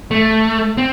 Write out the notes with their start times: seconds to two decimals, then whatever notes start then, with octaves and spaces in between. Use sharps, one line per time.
0.11 A3
0.77 C4